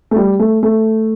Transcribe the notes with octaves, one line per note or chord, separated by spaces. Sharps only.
A3
G3
A3
A3